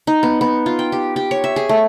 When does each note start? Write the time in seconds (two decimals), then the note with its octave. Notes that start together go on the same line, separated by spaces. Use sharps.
0.07 D#4
0.23 B3
0.41 B3
0.66 F4
0.79 G5
0.92 G4
1.16 G4
1.31 C#5
1.44 E5
1.56 G#4
1.69 A3